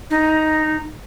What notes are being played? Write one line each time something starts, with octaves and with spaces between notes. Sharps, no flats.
D#4